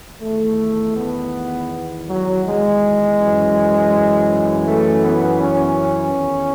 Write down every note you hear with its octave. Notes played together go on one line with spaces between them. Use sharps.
E2 D#3 A3
B3
F#3
G#3
F#2 E3
A3
B3
C#4
E2 D#3